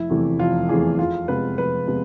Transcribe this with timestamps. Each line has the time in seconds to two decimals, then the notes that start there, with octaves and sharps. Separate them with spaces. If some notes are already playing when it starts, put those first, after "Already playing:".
Already playing: F1 E4
0.10 E2 C3 E3 A3
0.39 F1 F4
0.69 E2 C3 E3 A3 G#4
0.98 F1 F4
1.28 E2 C3 G#3 B3 B4
1.58 F1 B4
1.88 C3 G#3 B3